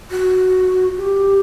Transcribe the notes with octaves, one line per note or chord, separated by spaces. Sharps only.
F#4
G4